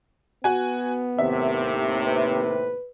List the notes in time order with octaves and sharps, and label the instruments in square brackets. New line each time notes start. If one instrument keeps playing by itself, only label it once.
[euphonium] B3 [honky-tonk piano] F#4 G#5
[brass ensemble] D#2 A2 C3 [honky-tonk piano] E5
[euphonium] B4